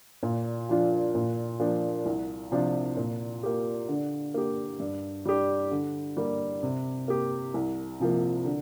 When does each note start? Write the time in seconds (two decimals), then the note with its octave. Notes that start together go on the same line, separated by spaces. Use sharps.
0.23 A#2
0.69 F3 D4 F4
1.15 A#2
1.60 F3 A#3 D4
2.06 C2
2.51 C3 F3 D4 F4
2.97 A#2
3.43 A#3 G4
3.89 D3
4.34 A#3 G4
4.80 G2
5.25 G3 D4 G4
5.71 D3
6.17 G3 A#3
6.63 C3
7.08 A#3 G4
7.54 C2
8.00 C3 F3 A#3
8.45 D3